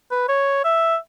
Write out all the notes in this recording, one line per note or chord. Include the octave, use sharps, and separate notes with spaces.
B4
C#5
E5